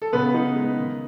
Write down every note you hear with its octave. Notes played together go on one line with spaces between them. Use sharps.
A4
C#3 B3 B4
D#4
G#3
D#3